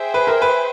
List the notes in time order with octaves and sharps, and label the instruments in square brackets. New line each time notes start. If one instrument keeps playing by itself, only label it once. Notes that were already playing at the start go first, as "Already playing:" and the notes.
Already playing: [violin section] G#4 C5 E5 G5
[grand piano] B4
A#4
B4